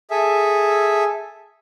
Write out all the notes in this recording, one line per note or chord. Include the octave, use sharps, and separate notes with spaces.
G#4 A4 E5